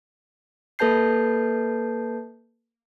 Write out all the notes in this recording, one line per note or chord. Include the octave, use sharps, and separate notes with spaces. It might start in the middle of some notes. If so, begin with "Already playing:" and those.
A#3 A4 B4 A5 G6 C7